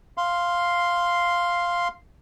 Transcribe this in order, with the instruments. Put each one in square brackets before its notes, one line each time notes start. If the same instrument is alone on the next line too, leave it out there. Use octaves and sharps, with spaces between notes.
[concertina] F5 C6